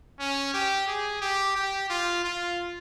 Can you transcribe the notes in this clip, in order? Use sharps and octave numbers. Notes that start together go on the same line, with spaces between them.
C#4
G4
G#4
G4
G4
F4
F4